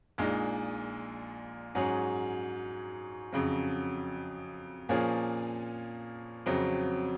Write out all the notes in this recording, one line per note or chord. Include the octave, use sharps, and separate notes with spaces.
A#1 A#2 G#3 D#4
G#2 F#3 C#4 G#4
F2 C#3 F#3
A#2 F3 A#3 C#4 G#4
F2 C#3 F#3 C4